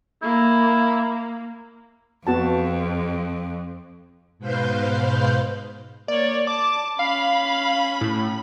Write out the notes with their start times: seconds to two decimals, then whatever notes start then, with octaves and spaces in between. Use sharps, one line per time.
0.23 A#3 E4
2.27 F2 B3 F#4 A5
4.39 G#2 B2 B4 C5 F5 G6
6.08 A#3 C#5 D5
6.47 A5 D6
6.99 C#4 F5 B5
8.01 A2